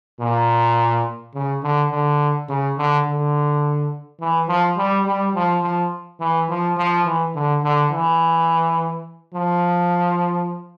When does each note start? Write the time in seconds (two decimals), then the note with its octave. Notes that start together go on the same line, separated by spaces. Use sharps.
0.20 A#2
1.34 C#3
1.63 D3
1.91 D3
2.49 C#3
2.78 D3
3.06 D3
4.20 E3
4.48 F3
4.77 G3
5.06 G3
5.35 F3
5.63 F3
6.20 E3
6.49 F3
6.77 F3
7.05 E3
7.35 D3
7.63 D3
7.92 E3
9.34 F3